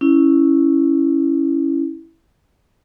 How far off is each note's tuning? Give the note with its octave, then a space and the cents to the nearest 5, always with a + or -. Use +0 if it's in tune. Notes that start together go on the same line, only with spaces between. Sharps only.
C#4 +0 E4 +0